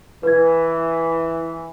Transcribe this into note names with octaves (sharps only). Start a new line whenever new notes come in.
E3 B4 G#6